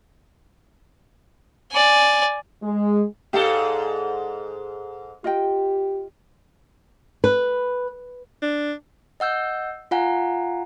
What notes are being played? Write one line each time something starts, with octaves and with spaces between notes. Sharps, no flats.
D5 G#5
G#3
G#2 G#3 G4 A4 D5 F5
F4 G4 D#5 G5
B4
D4
D#5 F#5 E6 G6
F4 F5 F#5 G#5 A#5